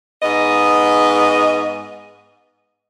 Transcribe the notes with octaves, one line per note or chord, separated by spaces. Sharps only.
G#2 B3 D#5